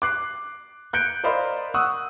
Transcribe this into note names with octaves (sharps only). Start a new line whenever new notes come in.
D6 F#6 C7
F#6 G6 C#7 D7
A#4 C5 D5 D#5 F5 B5
F#5 C#6 D#6 E6 F#6